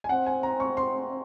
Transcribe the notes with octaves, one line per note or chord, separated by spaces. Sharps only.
G#5
C4 F#5
G#5
A#5
C#6
C6